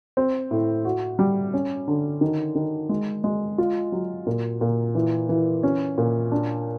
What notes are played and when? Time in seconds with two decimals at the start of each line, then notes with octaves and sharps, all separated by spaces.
0.17 C4
0.51 A2
0.85 F#4
1.19 G3
1.54 C#4
1.88 D3
2.21 D#3
2.55 D#3
2.89 G#3
3.24 G#3
3.58 F4
3.92 F#3
4.27 A#2
4.61 A#2
4.95 E3
5.29 E3
5.63 C#4
5.98 A#2
6.32 D4